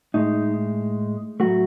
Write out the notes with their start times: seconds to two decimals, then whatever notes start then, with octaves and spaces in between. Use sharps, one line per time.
0.14 A2 G#3 D#4
1.40 A2 F#3 A3 F#4